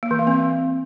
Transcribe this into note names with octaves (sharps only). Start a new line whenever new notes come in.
A#3
E3
A#3
C4